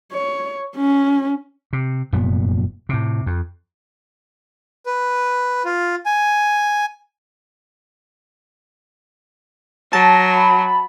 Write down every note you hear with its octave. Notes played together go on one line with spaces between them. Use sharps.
C#5
C#4
C3
F1 F#2 A#2 B3
A2 C3
F2
B4
F4
G#5
F#3 A5 A#6
B5